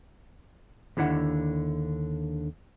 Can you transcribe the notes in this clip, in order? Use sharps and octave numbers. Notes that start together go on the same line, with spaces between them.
D#2 D3 E4 F#5